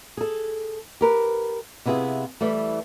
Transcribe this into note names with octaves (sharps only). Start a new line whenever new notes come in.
G#4 A4
G4 A#4 B4
C3 B3 E4 F4 G#4
E3 G3 A3